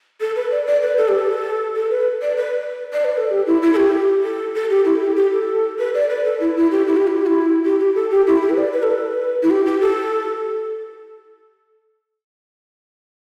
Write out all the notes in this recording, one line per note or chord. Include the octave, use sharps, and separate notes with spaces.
A4
B4
D5
D5
B4
A4
G4
A4
A4
B4
D5
B4
D5
B4
A4
G4
E4
E4
A4
G4
A4
A4
G4
E4
G4
G4
A4
B4
D5
B4
A4
E4
E4
G4
E4
G4
E4
G4
E4
G4
G4
A4
G4
E4
G4
B4
D5
B4
A4
B4
E4
G4
G4
A4